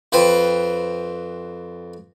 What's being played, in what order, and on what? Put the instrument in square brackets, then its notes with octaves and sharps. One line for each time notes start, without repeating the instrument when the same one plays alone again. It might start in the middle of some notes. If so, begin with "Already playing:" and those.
[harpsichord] F2 B4 C5 G5